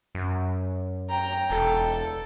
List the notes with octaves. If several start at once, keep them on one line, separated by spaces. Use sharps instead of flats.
F#2
G5 A#5
E1 A4